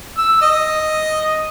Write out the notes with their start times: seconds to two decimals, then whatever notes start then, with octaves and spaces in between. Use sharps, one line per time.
0.18 E6
0.41 D#5